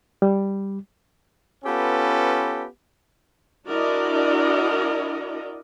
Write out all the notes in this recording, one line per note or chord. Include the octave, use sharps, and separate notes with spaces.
G3
B3 C#4 F4 G4 A4 B4
D4 E4 F#4 A#4 D5 D#5